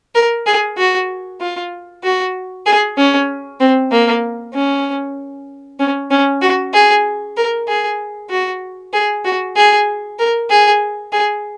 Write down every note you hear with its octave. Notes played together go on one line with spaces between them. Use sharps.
A#4
G#4
F#4
F4
F#4
G#4
C#4
C4
A#3
C#4
C#4
C#4
F#4
G#4
A#4
G#4
F#4
G#4
F#4
G#4
A#4
G#4
G#4